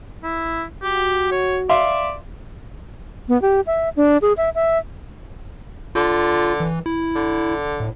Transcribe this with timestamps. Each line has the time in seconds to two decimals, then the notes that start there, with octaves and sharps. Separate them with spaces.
0.24 E4
0.83 F#4 G4
1.32 C#5
1.69 D5 E5 F5 C6
3.29 B3
3.42 G4
3.67 E5
3.96 D4
4.22 G#4
4.37 E5
4.55 E5
5.95 D3 F4
6.60 E3
6.86 E4
7.15 D3
7.80 A2